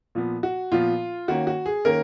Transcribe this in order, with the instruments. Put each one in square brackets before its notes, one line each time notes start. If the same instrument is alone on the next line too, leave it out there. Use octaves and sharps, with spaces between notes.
[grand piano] A#2 F3 B3
F#4
A#2 F3 B3 F4
D#3 A#3 C#4 F#4
F#4
G#4
D#3 A#3 C#4 A#4